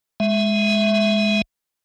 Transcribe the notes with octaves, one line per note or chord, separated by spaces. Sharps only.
G#3 E5